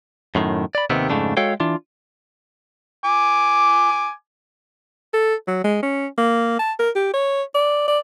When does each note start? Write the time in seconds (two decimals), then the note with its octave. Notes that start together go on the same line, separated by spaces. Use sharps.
0.35 F#2 A2 D#3
0.75 D5 B5
0.90 D#2 C3 D#3 B3 C4
1.10 F2 G#2 C#3 A3 D4
1.37 G#3 F#4 A4 C#5 F5 G5
1.60 E3 D4 F4
3.05 G#5 D6
5.14 A4
5.47 F#3
5.64 G#3
5.83 C#4
6.18 A#3
6.59 A5
6.79 A#4
6.95 G4
7.13 C#5
7.55 D5
7.88 D5